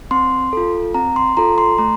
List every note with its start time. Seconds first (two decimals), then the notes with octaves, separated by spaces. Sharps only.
0.11 C4 C6
0.53 F4 A4
0.94 C4 A#5
1.16 C6
1.37 F4 A4 A#5
1.58 C6
1.78 A3 A#5